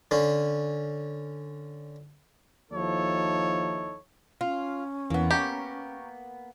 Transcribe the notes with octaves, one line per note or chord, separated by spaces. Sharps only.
D3 C#4
D#2 F3 D#4 E4 A4 C#5
C#4 F4
E2 E3 A#3 B3
G4 A#5 C#6